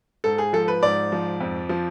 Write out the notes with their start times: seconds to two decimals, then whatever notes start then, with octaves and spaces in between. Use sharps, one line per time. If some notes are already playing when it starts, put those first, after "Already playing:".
0.24 G#2 A4
0.38 G#4
0.53 F3 A4
0.68 B4
0.82 G#2 D5
1.12 F3
1.41 F2
1.69 F3